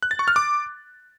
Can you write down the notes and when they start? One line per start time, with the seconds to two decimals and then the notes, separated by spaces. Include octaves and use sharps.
0.03 F#6
0.11 A6
0.19 C#6
0.28 F6
0.36 D6